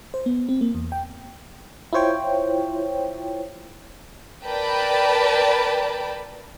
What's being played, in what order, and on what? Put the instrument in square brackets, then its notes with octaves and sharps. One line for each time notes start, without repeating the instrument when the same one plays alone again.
[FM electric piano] C5
B3
C4
A#3
E2
G5
E4 F4 C5 C#5 G5
[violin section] A#4 B4 D5 G5 A5 B5